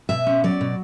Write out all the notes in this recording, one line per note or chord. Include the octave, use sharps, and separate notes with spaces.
B2 E5
C#4
F#3 D5
B2